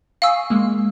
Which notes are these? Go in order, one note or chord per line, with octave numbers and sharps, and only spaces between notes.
F5 G#5 C#6 D#6 E6
G#3 A#3